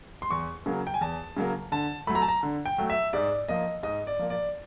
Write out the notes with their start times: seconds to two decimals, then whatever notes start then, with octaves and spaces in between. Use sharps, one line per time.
0.22 C6
0.31 E2 C#6
0.66 C#3 F#3 A#3
0.87 G5
0.94 G#5
1.01 E2 A5
1.37 C#3 F#3 A#3
1.72 D3 A5
2.07 F#3 A3 B5
2.15 A#5
2.22 A5
2.28 A#5
2.43 D3
2.66 G5
2.78 F#3 A3
2.90 E5
3.13 G#2 D5
3.48 F3 A#3 D#5
3.83 G#2 D#5
4.07 D5
4.19 F3 A#3
4.30 D5